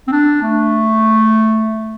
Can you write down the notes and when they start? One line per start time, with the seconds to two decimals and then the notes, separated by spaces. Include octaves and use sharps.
0.08 C4
0.12 D4
0.42 A3